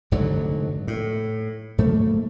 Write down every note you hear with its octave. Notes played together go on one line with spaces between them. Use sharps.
F1 G#2 D3 F#3
A2
G#2 F#3 A3 A#3